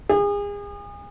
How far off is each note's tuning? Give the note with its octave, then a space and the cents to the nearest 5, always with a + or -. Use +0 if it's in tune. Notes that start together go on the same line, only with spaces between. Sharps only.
G#4 -35